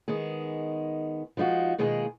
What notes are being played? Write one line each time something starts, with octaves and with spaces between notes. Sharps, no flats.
D#3 G#3 B3 G#4
F3 G#3 D#4 F4 F#4
B2 D#3 G#3 A#3 F4 G#4